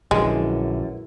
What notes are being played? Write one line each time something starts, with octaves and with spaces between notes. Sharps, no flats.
A#1 F#2 D3 E3 G#3